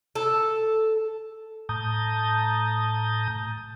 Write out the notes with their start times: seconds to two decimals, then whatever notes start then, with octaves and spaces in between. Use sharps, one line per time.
0.15 A4
1.69 A2 A5 A#5 D#6 G6